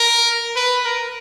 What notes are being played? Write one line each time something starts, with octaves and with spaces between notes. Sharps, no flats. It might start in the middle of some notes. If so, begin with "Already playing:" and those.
Already playing: A#4
B4
A#4